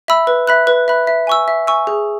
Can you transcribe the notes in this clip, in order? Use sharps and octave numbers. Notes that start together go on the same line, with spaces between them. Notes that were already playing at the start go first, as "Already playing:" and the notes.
E5 B5 E6
B4
E5 B5 F#6
B4
E5 B5 F#6
E5
G#5 C#6 E6
E5
G#5 C#6 E6
G#4